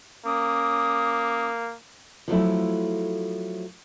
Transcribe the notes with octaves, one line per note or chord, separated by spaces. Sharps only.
A#3 C#4 D6 D#6
F3 F#3 A3 E4